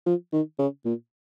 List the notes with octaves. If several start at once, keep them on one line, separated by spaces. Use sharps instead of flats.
F3
D#3
C#3
A#2